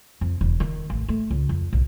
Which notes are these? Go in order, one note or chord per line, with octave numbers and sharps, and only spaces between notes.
F2
E1
D#3
A1
A3
C#2
F2
B1